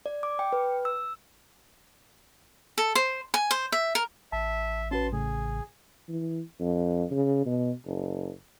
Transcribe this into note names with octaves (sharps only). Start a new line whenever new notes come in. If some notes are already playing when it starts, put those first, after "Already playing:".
D5
D6
G5
B4
E6
A4
C5
G#5
C5
E5
A#4
A1 E5 A5
C#4 F#4 B4 A5 C6
A2 C#3 G#4
E3
F2
C#3
B2
F#1